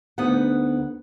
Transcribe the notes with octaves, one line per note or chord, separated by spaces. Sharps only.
D2 B3 D#4 B4 F#5